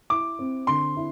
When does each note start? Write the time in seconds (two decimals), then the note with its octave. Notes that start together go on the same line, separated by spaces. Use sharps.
0.10 E4 D6
0.39 C4
0.67 D3 C6
0.97 E4